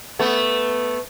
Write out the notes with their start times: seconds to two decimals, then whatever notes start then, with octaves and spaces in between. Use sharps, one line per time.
0.19 A3 B3